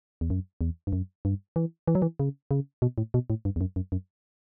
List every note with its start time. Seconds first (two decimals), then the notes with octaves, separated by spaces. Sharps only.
0.21 E2
0.30 F#2
0.61 E2
0.87 G2
0.93 F#2
1.25 G2
1.56 E3
1.88 E3
1.95 F#3
2.02 E3
2.20 C#3
2.51 C#3
2.82 B2
2.98 A2
3.14 B2
3.30 A2
3.45 G2
3.56 E2
3.61 F#2
3.76 F#2
3.92 F#2